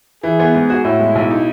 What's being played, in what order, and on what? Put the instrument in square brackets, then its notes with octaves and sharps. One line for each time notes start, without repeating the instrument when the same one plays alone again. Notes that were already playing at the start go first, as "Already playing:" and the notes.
[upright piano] E3 [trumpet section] G#4
[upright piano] B3
G#2
F#4
[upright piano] A2 [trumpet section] E4
[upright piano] G#3
B1
D#4